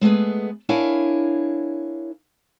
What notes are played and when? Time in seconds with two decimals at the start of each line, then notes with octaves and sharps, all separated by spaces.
0.01 G#3 A3 B3 G#4 B4
0.69 D4 E4 A#4 C#5 F5 G#5